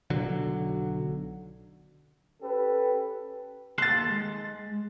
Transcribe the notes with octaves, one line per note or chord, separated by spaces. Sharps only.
B1 D3 F#3
C#4 G4 A4 B4
D#2 A4 C6 F#6 A6
G#3